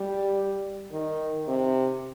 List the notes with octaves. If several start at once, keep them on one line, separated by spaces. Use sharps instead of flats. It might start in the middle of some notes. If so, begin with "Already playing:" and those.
Already playing: G3
D#3
C3